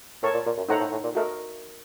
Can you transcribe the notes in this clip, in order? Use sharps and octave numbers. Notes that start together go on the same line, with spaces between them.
A2 A#4 C#5 A5 C#6
A#2
A#2
F#2
A2 D#4 A4 C5 F#5 A#5
A2
A2
A#2
A3 F#4 A#4 D#5